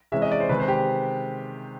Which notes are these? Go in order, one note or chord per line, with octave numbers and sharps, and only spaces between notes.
C3 E3 G#3 C#4 E5
D#5
D5
C5
C3 D#3 G#3 B4
C5
G4